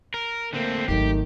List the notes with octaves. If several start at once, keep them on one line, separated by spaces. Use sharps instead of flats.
A#4
D3 A3 A#3 C4
G#1 D#3 F#3 A3 G4